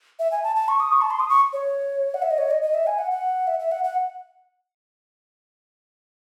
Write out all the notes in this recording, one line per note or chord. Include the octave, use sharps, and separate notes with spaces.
E5
G#5
A5
A5
C#6
D#6
C#6
A5
C6
D#6
C#6
C#5
F#5
E5
D#5
C#5
D#5
D#5
E5
G#5
F#5
F#5
E5
E5
F#5
F#5